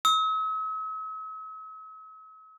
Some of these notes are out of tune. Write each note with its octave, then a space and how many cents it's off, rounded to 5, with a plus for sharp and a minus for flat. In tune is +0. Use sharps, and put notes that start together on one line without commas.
E6 -45